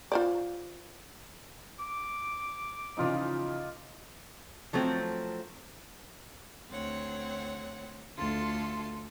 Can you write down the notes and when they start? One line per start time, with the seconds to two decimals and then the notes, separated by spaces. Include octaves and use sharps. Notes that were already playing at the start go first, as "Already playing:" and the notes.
0.12 F4 C5 D5
1.80 D6
2.97 C#3 E3 F3 D#4 F4 D5
4.73 F3 F#3 A3 C4
6.70 D2 C4 C#5 F#5
8.17 D2 F4 A4 C6